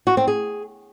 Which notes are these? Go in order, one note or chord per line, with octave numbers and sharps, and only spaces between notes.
F#4
C4
G#4